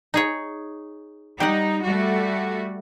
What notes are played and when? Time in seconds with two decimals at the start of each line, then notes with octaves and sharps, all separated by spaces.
0.14 D#4 G#4 C#5
1.40 G3 D#4 G4 F#5
1.84 G3 A3 F#4